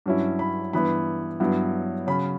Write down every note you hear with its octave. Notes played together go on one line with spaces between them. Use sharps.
G2 F#3 C#4 E4
B5
G2 E3 B3 E4 B5
G2 F#3 B3 E4
C#3 F#3 C#4 B5